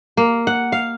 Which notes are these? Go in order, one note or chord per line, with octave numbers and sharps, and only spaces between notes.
A#3
F#5
F5